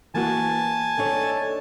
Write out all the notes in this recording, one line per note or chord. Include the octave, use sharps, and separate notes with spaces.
E3 A#3 F#4 G#5 A5
D4 D#4 A4 C#5